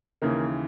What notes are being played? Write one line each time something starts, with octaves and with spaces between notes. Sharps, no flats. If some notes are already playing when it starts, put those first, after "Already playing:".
D#2 C#3 E3 A#3